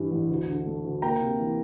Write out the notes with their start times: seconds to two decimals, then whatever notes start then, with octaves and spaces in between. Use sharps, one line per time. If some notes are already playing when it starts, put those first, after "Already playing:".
Already playing: G2 E3 G3
0.11 A1
0.29 D2
0.47 D3
0.66 A3
0.84 D2
1.02 A#3 G5 A#5
1.21 C3
1.39 E3